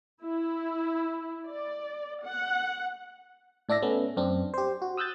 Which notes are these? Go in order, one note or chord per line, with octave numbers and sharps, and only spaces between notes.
E4
D5
F#5
A2 D4 D5 E5 A#6
A3 B3 C#4
F#2 C4 D4
G4 C5
F#4
D#6 E6 F#6 G6 A6